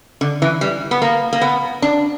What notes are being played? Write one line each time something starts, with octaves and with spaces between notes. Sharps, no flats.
D3
E3
G3
B3
A#3
A#3
B3
D4